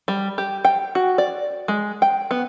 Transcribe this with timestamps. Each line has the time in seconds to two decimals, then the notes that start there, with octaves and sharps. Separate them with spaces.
0.08 G3
0.38 G4
0.65 G5
0.95 F#4
1.18 D5
1.68 G#3
2.02 G5
2.31 B3